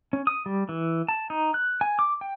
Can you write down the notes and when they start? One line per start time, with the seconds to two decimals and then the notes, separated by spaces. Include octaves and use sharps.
0.13 C#4
0.27 D#6
0.46 G3
0.69 E3
1.09 A5
1.30 D#4
1.54 F#6
1.81 G#5
1.99 D6
2.21 G5